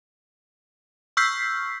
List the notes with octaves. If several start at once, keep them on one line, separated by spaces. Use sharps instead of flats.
C#6 E6 F6 G6 B6 C7